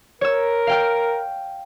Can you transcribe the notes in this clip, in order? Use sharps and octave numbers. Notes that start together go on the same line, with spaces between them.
A#4 C#5 E6
F5 G5 F6